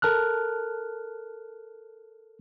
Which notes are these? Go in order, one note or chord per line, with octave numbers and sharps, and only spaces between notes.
A4 A#4 A5 F6 F#6